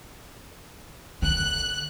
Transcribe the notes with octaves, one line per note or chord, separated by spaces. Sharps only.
D3 F#6